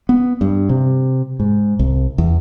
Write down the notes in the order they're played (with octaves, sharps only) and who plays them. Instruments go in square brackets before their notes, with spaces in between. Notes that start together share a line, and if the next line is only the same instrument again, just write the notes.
[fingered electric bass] B3
G2
C3
G#2
C2
E2